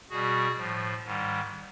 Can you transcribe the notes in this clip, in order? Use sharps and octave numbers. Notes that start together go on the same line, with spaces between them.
B2 G3 F#4 G#4
A2 F3
G#2 D#3 G3